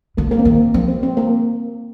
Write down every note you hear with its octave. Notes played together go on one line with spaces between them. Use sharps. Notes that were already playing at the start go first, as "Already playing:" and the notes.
D3 A#3
A#3
C4
D#3 A#3
F3 C4
C4
C4
A#3